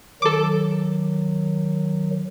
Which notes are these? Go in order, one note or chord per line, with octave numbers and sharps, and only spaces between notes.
D#3 F#3 A4 D6